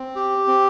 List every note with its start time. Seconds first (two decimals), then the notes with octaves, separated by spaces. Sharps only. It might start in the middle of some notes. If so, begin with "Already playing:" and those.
Already playing: C4
0.16 G4
0.48 C4